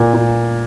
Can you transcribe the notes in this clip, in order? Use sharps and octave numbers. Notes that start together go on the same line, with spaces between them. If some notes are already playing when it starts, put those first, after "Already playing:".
Already playing: A#2
A#2